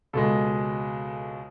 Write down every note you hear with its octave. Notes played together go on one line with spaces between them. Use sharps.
C#2 B2 G#3 A4